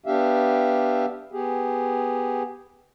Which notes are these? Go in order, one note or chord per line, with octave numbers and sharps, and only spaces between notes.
B3 D4 G4 E5 F5
B3 G4 G#4